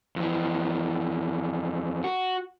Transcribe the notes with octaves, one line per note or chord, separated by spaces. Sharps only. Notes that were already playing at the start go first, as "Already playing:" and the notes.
F2 E3
F#4